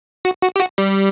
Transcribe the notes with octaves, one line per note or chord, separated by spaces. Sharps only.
F#4
F#4
G4
F#4
G3